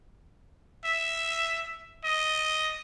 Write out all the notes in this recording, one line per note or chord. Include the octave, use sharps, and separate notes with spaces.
E5
D#5